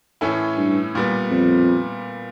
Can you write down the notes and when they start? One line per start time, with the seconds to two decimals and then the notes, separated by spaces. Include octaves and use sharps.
0.21 A2 E3 A3 C#4 E4
0.57 G2
0.95 A#2 G3 B3
1.31 F2